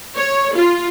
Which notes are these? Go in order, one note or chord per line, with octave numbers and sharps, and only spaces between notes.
C#5
F4